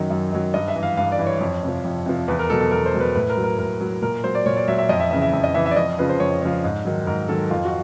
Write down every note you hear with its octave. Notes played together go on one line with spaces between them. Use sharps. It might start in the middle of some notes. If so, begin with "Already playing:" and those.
Already playing: F#2 D#3 F#3
F#2
D#3 F#3
G2 D#5
E5
E3
F5
G2 F5
D5
E3
C#5
F2
C3 F3
F2
C3 F3
E2 B4
A#4
B2 F#3 A4
A4
E2 A#4
C5
B2 F#3
B4
A2 B4
A#4
F#3
A#4
A2 A#4
F#3
A#2 A#4
F#3 C5
D5
A#2 C#5
D5
F#3 E5
E5
F2 D#5
E5
C#3 E3 E5
E5
F2 E5
D#5
C#3 E3 E5
E5
D5
F2 D#5
C#3 F3 B4
C5
F2 C#5
C#3 F3 C#5
G#2
D#3 F#3
G#2 A#4
D#3 F#3 A4
F2 F4
F#4